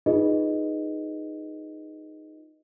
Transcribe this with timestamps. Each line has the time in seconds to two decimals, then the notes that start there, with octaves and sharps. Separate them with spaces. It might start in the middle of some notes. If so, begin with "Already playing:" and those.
0.06 D#4 F4 G#4 B4 D#5